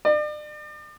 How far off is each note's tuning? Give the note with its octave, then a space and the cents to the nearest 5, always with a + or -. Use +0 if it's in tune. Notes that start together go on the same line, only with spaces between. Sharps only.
D5 +40